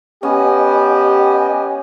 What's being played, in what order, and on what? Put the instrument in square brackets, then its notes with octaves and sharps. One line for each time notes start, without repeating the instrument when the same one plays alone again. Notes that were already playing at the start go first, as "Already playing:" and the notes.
[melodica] B3 [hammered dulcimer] C#4 [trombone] G4 [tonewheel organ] D#5 G#5